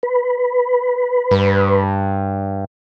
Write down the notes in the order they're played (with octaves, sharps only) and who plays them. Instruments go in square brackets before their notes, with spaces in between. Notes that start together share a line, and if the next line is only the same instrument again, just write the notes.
[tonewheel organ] B4
[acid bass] G2